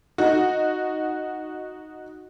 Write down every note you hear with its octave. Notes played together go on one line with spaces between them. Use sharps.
D#4 F#4